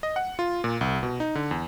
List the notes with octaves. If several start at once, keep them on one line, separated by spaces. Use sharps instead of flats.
D#5
F#5
F4
A#2
C2
B2
D#4
D3
E2